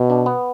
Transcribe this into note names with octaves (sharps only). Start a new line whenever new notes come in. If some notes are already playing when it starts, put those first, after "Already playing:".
Already playing: B2
D4
B3